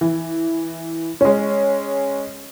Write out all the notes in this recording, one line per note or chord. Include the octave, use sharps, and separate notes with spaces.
E3
G#3 C#4